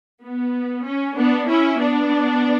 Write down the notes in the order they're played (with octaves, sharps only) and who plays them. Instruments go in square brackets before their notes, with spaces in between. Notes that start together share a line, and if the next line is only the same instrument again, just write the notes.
[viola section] B3
C#4
B3 D4
C#4 E4
B3 D4